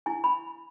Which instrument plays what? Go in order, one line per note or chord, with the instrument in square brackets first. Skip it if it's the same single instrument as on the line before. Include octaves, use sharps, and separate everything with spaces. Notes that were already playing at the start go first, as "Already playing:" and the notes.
[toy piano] E4 G#5
B5